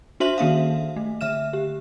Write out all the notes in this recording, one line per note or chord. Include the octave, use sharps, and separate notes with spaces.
D4 F#4 C5 E5 C6 F#7
D#3 A#3 E5 F5
A3
D3 E5 F6 E7
G4